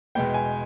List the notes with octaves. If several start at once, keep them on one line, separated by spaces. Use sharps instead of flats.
E2 B2 G#3 B3 G5
G#5